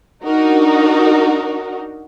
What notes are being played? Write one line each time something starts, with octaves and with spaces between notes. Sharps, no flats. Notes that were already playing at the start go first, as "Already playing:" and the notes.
D4 D#4 F#4 A#4